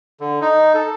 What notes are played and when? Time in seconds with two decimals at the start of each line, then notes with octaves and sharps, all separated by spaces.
0.20 D3
0.41 D#4
0.74 A4